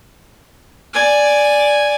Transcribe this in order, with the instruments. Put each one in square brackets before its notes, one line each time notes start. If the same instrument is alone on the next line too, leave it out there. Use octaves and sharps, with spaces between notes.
[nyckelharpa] D5 G#5